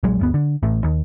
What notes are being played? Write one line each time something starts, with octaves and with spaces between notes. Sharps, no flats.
A#1 F#3 G#3
G1 D2 B3
D3
A1 A2
D#2